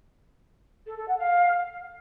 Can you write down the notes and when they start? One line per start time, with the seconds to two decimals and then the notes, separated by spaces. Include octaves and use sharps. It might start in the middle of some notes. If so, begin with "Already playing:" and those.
0.87 A4
0.97 A4
1.08 F#5
1.19 F5